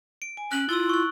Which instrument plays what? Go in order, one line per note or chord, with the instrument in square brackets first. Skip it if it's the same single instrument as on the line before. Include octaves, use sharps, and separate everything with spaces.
[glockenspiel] D7
[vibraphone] G#5
[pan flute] C#4 [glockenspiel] F#6 F#7
[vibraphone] E4 [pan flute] F4 [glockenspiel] E6 A6
[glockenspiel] C#6 F#6